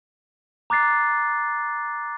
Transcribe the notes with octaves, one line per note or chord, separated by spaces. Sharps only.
A#5 D6 F#6 A6 C7